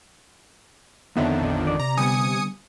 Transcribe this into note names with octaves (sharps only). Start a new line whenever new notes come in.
F2 D3 D#3 B3 C#5 E5
A#1
G#1 D5
C3 A#5
D3 G3 B3 G#5 D#6 C#7